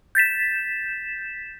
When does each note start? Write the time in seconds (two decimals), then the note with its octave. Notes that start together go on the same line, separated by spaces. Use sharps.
0.15 G6 A6 B6 E7